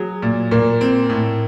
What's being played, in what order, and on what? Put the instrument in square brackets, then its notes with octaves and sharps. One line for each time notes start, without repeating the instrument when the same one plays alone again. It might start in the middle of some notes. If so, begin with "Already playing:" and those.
Already playing: [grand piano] F#3 [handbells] G#4
[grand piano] A#2
[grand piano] A#2 [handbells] A#4
[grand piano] C4
A2